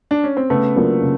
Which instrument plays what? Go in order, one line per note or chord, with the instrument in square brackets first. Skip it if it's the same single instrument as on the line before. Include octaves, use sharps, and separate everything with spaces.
[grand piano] D4
C#4
C4
[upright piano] C#3 [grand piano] A3 B3
[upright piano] F#3 A#3 D4 F4
C#3